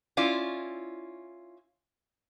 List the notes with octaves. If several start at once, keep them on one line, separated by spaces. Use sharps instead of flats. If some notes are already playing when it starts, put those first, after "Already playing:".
C#4 E4 F4 D5